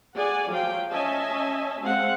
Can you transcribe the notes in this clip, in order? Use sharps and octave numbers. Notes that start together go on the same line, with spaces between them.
G#4 D5 F#5 G#5
F3 F#3 F5 G5
C#4 D#5 E5 G#5 A5
G#3 C4 F5 F#5